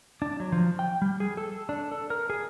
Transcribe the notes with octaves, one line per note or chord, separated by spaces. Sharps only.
D4
F#3
F3
G5
G3
G#4
A4
D4
A4
A#4
G#4